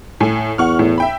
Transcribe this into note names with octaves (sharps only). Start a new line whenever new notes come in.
A2 G#5
E2 F#5 C#6 F6
A2
E5 G5 B5